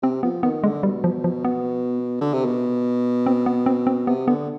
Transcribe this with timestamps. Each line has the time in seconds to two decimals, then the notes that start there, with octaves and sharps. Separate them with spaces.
0.02 C3 C4
0.23 F3 B3
0.43 D#3 B3
0.63 D3 G#3
0.83 B2 G3
1.04 F3
1.24 F3
1.45 B3
2.21 D3
2.33 C3
2.45 B2
3.26 C4
3.46 B3
3.66 C4
3.87 C4
4.07 C3 B3
4.27 D3 B3